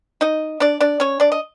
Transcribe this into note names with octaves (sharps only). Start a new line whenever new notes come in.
D#4 D#5
D4 D5
D4 D5
C#4 C#5
D4 D5
D#5